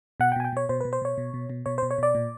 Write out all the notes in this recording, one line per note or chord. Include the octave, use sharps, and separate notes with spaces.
B2 F#5
G5
B2 G#5
G5
B2 C#5
B2 C5
B4
B2
C5
B2 C#5
B2
B2
B2
B2 C#5
C5
B2
C#5
B2 D5
A#2